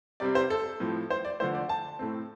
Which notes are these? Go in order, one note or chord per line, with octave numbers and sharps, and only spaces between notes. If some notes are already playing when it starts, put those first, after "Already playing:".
C3 G3 C4 D5
C5
A4
A2 F3 C4
C5
D5
D3 F3 A3 C5
D5
A5
A2 A3 C4